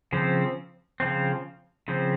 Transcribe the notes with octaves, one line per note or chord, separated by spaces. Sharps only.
C#3 F3 C4
C#3 F3 C4
C#3 F3 C4